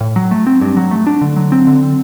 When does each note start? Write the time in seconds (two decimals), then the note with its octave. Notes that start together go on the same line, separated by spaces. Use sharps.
0.01 A2
0.16 F#3
0.31 A3
0.47 C4
0.61 G2
0.77 F#3
0.91 A3
1.07 D4
1.21 D3
1.36 F#3
1.52 C4
1.67 D3